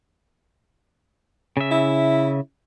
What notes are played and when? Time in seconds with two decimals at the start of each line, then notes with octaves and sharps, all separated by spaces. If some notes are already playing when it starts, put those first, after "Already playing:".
1.57 C#3 E5
1.71 E4